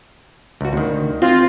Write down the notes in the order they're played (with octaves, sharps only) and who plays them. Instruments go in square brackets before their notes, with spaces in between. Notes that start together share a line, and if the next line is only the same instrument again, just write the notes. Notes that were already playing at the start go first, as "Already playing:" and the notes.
[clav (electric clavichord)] C#2 F#4
D2 D#3
[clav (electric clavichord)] C4 [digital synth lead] F4